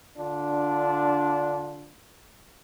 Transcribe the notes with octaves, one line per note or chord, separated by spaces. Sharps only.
D3 D4 F4